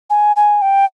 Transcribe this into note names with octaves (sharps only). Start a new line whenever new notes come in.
G#5
G#5
G5